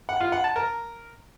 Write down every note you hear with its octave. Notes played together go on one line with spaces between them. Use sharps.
F#5
F4
F#5
A5
A#4